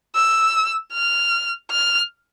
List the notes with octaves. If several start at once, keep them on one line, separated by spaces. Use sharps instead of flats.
E6
F6
F6